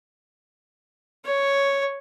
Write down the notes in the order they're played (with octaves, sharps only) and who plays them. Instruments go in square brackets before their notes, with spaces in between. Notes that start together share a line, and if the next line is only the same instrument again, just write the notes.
[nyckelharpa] C#5